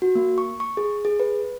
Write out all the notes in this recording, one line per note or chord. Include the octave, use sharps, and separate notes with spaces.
F#4
A#3
C#6
C#6
G#4
G#4
B4